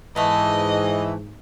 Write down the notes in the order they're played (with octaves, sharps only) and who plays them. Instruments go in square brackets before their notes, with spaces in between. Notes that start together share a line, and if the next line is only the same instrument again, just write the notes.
[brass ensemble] G#2 [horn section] E3 [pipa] A3 B3 [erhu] D#5